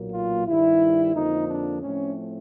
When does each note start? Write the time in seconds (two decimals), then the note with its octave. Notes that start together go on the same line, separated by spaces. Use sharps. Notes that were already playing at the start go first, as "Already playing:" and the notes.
Already playing: B1 A#2 F#3 A#3
0.12 F4
0.46 G2 D#3 G3 E4
1.14 F2 D3 F3 A#3 D#4
1.48 D4
1.82 A2 F3 A3 C4 C#4